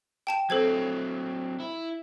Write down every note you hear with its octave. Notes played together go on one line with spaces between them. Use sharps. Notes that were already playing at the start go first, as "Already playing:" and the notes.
G5 A5 E7
F#3 C4 A4 C5 G#6
E4